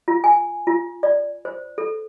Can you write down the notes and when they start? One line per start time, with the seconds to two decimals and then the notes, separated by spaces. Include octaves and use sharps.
0.08 F4
0.24 G#5
0.67 F4
1.03 D5
1.45 C5
1.78 A4